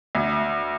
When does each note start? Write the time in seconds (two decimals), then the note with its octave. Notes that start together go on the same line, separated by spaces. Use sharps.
0.15 D2